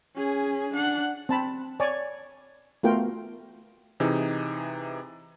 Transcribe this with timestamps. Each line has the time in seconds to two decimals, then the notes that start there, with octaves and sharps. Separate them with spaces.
0.16 C#4 G#4
0.74 D4 F#5
1.29 C4 A5 B5
1.80 C#5 D5 G#5
2.83 A3 B3 F4 F#4 A#4 G5
4.00 C3 E3 D#4 G#4